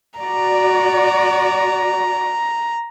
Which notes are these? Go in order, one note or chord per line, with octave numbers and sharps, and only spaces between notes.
F#4 D5 A#5